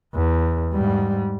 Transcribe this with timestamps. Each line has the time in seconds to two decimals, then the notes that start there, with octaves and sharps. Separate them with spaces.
0.15 E2
0.74 G#2 G3